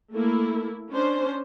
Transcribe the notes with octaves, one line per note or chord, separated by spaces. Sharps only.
A3 A#3 E4
C#4 D4 C5